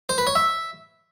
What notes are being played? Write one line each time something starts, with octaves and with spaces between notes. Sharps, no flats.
C5
B4
C#5
E5